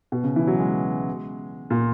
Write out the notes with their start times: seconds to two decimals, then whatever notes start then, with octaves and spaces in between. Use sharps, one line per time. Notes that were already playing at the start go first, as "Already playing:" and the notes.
0.12 B2
0.24 C#3
0.36 E3
0.47 F#3
0.59 G#3
1.70 A#2